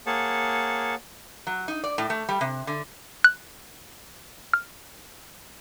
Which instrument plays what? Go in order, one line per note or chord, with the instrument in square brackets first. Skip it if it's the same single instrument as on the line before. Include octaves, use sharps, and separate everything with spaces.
[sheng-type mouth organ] A#3 G#4 C#5 F#5 A5
[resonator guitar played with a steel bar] F#3
D#4
D5
A2
A3
G3
C3
D3
[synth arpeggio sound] F#6
F6